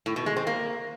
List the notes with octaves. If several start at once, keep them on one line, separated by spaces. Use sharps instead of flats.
A2
B2
G#3
C4
A#3